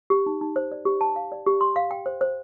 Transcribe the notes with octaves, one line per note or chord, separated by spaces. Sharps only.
G4
D#4
D#4
C5
D5
G4
A5
F5
D5
G4
C6
F5
G5
C5
C5